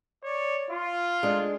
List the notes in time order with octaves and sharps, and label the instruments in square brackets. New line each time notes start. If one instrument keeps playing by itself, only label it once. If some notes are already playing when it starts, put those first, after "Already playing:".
[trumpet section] C#5 D5
F4
[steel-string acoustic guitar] G#3 D4